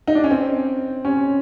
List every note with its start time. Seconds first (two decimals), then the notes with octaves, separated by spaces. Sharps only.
0.08 D#4
0.15 D4
0.24 C#4
0.31 C4
1.05 C#4